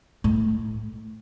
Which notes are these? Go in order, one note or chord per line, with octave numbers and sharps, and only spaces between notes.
A2